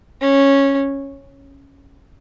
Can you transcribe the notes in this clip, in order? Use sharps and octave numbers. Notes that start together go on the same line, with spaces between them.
C#4